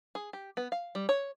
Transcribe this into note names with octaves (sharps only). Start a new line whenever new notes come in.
G#4
G4
B3
F5
G3
C#5